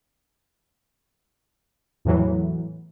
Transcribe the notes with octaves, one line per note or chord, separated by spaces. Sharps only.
E2 A2 E3 F#3